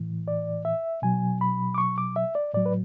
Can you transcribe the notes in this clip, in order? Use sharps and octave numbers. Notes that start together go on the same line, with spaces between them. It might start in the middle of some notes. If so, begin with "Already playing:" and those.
Already playing: A2 E3
D5
E5
B2 F#3 G#5
B5
D6
C#6
D6
E5
D5
A2 F#3 D5
B4